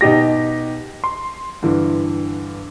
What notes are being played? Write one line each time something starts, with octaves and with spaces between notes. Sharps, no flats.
B2 D#4 G4 A#6
C6
G2 D3 E3